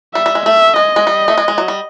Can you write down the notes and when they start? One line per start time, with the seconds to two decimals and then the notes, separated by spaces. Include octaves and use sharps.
0.15 G3 E5
0.26 G3
0.35 G#3
0.46 A3 E5
0.76 G#3 D#5
0.96 G#3
1.07 G3
1.28 A3
1.37 G#3
1.48 G#3
1.58 F#3
1.68 G3